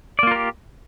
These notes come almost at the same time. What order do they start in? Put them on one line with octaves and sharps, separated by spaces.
D5 A#3 F4 A#4 G4